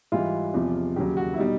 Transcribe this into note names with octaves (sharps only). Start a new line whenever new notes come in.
G#2 E3 G3 F4
E2 C3 F3
D#2 C#3 F#3 G4
F#4
E4
B2 G3 D#4